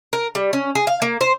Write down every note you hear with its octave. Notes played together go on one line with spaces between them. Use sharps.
A#4
G3
C#4
G#4
F5
A#3
C5